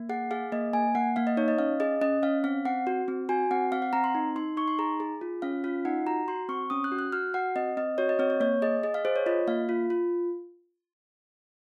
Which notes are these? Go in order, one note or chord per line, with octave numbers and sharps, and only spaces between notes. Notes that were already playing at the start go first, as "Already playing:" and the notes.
Already playing: A#3
G#4 F#5
G#4 F5
A#3 D#5
A#3 G#5
A#3 F#5
A#3 F5
D#5
D#4 C#5
D#5
C#4 F5
G#4 D#5
C#4 D#5
C#4 F5
C4 F5
C4 F#5
F#4
C4
F#4 G#5
C4 F#5
C4 F5
F#5
C4 A#5
C6
D#4
D#4 C6
D#4 C#6
C6
G#4 A#5
G#4
F4
C#4 F5
F4 F5
D#4 F#5
F#4 A#5
F#4 C6
C4 C#6
C#4 D#6
F#6
F#4
F#6
F#4 F6
F#4 F#5
C4 D#5
C4 D#5
F#4 C#5
D#5
C4 C#5
C#5
A#3 C#5
G#4 D#5
G#4 D#5
F5
G#4 C5
C#5
F4 D#5
A#3 F5
F4
F4